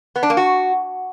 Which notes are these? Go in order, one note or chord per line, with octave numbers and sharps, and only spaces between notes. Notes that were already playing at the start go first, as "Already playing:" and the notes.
B3
D4
A#3
F#4